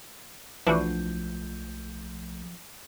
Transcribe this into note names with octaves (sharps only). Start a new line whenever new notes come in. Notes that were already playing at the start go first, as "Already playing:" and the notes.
B1 E3 F3 A3 D4 E4 F#4 G6